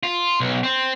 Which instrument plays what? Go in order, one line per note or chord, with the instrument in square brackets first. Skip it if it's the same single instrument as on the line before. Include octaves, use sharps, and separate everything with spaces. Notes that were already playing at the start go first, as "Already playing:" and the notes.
[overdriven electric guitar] F4
B1
C4